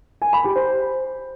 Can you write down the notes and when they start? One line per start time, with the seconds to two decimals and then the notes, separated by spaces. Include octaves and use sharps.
0.22 G#5
0.33 B5
0.44 G4
0.56 C5